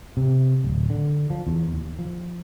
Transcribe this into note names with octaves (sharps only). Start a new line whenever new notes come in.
C3
D1
D3
F3
E2
D#2
F3